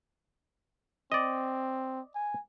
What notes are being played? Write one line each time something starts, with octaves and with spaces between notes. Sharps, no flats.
C4 D5 D#5
G#5